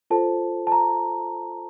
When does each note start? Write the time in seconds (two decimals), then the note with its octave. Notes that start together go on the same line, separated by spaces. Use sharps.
0.10 F4 A4 C5 A5
0.67 A5
0.72 A#5